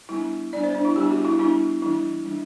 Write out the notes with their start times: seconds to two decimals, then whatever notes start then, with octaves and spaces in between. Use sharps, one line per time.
0.09 G3 B3 D4 E4
0.53 G3 B3 D4 D5
0.63 C5
0.75 D4
0.85 E4
0.96 G3 B3 D4 G4
1.11 F#4
1.25 E4
1.39 G3 B3 D4 E4
1.82 E3 G3 D4 E4
2.25 E3 G3 D4